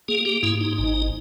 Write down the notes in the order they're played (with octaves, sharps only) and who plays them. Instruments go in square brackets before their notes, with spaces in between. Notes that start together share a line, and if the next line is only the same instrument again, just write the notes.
[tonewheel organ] A#3 G#4
G4
G#2 E4
D#4
G#1 D#4